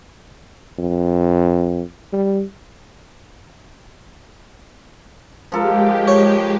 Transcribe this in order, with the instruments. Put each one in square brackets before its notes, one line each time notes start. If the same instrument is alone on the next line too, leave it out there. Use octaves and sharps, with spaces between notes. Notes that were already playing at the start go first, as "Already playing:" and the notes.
[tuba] F2
G3
[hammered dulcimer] F3 A4 A#4 [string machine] G#3 G4
[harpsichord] C#5